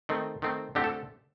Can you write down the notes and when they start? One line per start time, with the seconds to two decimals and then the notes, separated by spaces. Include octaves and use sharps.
0.09 D#3 A3 C4
0.42 D#3 A3 C4
0.75 D3 A3 C4 G4
0.84 A4